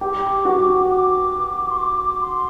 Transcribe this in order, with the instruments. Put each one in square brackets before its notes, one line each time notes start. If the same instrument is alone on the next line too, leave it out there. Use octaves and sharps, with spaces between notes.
[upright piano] G4 [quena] D6
[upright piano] F#4
[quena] D6
C6
D6
C6